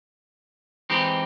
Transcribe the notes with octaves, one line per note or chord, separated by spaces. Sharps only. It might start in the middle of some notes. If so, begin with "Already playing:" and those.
E3 G#3 C4 D#4 G4